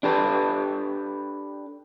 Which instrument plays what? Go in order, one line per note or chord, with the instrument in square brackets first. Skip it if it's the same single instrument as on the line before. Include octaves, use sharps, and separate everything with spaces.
[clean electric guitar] D4 G4 A4 B4